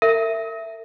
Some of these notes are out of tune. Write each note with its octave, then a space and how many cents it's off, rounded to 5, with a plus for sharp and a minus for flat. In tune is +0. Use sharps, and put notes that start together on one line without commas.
A#4 -40 E5 +5